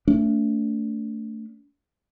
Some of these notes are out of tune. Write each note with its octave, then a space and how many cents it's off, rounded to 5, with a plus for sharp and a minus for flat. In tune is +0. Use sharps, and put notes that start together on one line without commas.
A3 +20 D4 -35